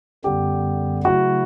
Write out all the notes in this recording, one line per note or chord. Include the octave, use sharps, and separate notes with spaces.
F#2 D3 G3 B3 G4
C#3 F#3 A3 E4 F#4